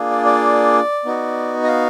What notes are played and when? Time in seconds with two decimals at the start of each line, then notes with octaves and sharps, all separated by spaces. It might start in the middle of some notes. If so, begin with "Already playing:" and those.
Already playing: A#3 D4 F4 G#4
0.10 D5
0.25 D5
1.05 B3 D#4 F#4
1.64 D#5
1.68 F5